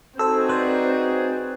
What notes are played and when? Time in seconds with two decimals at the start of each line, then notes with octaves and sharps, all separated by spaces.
0.19 C4 D#4 F#4 G#4 A4 C5 E6
0.49 B4 C5 D5